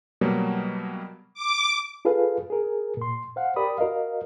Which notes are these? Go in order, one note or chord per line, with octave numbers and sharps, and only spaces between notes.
B2 F#3 G3 A#3
D6
F4 G#4 A4 B4 F5
G#4 A#4
A#2 C6
C5 F5 F#5
G4 A#4 D5 B5 D#6
F#4 A#4 D#5 F5